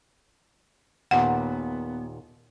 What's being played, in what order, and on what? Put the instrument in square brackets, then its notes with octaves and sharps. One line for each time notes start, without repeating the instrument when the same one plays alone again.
[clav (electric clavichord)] D#2 A#2 [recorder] B3 [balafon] F#5